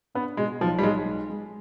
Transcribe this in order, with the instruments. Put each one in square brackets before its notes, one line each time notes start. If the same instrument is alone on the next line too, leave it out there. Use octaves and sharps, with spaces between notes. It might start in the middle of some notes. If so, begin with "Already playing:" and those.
[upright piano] B3 [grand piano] D4
[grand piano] B2 [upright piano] G#3
[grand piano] B1 [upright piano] F3
[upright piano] G3
[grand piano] B1 [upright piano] G#3
[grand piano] G#3
G#3